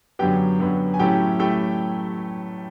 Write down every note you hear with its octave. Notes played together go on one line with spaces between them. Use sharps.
F#2 D3 F#3 B3 G4 G5
F#2 D3 F#3 B3
G#5
A2 F#3 A3 C#4 E4 G4 G5
A3 E4 G4 G5